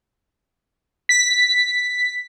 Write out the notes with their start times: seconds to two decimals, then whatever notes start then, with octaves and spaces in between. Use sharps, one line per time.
1.09 B6